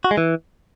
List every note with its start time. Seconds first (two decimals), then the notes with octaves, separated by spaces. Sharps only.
0.04 F#4
0.11 G#3
0.17 E3